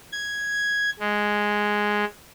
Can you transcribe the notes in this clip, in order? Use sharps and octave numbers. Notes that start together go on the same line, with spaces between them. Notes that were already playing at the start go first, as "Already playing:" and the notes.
G#6
G#3